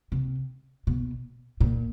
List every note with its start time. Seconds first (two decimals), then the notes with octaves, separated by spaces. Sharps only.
0.12 C3
0.87 B2
1.61 A#2